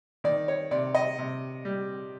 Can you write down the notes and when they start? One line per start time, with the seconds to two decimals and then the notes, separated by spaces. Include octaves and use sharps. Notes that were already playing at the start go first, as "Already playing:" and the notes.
0.24 D#3 D5
0.48 C#5
0.71 C3 D5
0.95 D#5
1.19 C3
1.65 G3